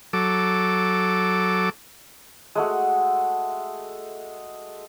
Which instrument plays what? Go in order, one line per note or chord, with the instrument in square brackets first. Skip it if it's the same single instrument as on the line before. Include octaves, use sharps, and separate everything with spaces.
[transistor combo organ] F#3 A4 D6
[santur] G#3 A3 F#4